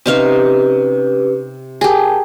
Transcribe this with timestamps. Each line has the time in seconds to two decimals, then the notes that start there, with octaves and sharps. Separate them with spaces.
0.06 C3 C#4 D#4 G4 B4 F5
1.81 G4 G#4 A#4 G5 A5